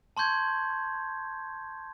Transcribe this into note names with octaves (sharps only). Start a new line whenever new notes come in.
A5 C6 C#6 G6 G#6